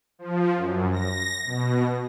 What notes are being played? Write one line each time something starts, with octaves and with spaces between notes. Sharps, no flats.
F3
F#2
A#6
B2